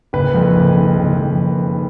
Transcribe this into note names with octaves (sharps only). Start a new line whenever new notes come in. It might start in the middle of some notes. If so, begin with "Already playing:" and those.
F#1 B4
F2
F#1
D#3
F#1
F2